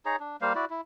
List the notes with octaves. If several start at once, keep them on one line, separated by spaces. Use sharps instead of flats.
D#4 G#4 C#5 A#5
D4
G3 A#3 C5 F5
E4 F#4 D5
E4